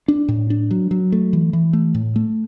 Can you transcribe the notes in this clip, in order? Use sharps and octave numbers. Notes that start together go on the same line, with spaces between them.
D4
A2
D4
F#3
F#3
A3
E3
E3
A3
A2
A3